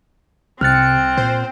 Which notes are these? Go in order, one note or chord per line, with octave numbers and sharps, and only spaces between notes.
C2 C3 C4 F6 F#6 A6 C#7
A#2 C5